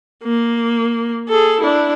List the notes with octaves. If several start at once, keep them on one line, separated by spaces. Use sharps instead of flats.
A#3
G#4 A4
D4 E4